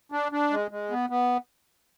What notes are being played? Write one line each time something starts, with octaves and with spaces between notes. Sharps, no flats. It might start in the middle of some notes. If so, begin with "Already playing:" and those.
D4
D4
G#3
G#3
B3
B3